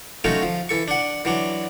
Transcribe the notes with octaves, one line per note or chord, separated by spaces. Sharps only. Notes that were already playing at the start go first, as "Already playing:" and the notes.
F#3 A3 C#4 D#4 F4 F#4
F3
E3 A4 C#6
D4 F#5
E3 F#3 D4